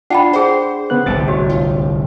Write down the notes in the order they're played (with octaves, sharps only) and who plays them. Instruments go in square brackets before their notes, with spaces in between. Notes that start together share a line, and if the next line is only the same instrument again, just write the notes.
[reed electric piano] D4 [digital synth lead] F4 [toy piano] F#5 G5 B5
[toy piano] G#4 F#5 [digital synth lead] C5
[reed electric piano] C#3 B3 F#6
[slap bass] D1 C2 C3 [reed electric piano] A6
[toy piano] F#4 [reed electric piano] C#5
[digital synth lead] F4